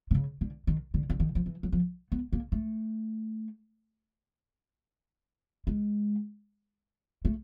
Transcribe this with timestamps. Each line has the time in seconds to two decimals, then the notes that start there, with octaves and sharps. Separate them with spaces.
0.11 C3
0.15 C#3
0.41 D3
0.67 D#3
0.94 D3
1.10 D3
1.20 D#3
1.35 F3
1.46 E3
1.63 F#3
1.72 F3
2.12 B3
2.33 A#3
2.52 A3
5.67 G#3
7.25 A3